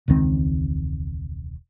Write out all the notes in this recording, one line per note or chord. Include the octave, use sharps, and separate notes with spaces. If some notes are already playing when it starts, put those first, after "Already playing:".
E1 C#2 D#3 C4